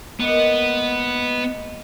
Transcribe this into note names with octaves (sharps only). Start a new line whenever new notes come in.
G#3 A#3 B3 D#5